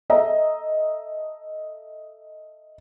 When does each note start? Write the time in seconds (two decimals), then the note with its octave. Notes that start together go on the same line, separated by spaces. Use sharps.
0.10 A4 D#5 E5 A#5